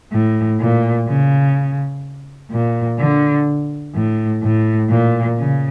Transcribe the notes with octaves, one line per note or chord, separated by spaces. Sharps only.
A2
A#2
C#3
A#2
D3
A2
A2
A#2
C#3